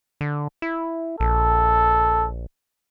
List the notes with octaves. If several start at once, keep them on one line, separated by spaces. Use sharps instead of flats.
D3
E4
A#1 A4